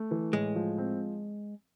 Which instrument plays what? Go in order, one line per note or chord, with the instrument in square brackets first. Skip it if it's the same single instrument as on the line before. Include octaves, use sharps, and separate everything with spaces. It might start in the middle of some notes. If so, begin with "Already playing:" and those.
Already playing: [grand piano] A3
E3
[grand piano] A2 [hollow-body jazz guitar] G#3
[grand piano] F3
C4